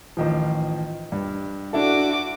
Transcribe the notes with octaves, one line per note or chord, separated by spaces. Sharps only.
A1 D#3 F3
G2
D4 E4 F#4 A4 D6